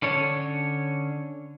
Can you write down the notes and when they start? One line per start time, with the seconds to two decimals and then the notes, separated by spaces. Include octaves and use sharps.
0.02 D3 C#4 D4 C#5